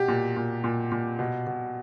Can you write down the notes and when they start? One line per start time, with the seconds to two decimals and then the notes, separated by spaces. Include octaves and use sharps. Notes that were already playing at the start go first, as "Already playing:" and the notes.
Already playing: B2 G4
0.08 A#2
0.37 A#2
0.64 A#2
0.92 A#2
1.19 B2
1.47 B2